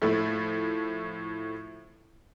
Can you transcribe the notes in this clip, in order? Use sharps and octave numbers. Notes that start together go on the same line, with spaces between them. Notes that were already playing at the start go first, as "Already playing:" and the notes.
A2 F3 A3 E4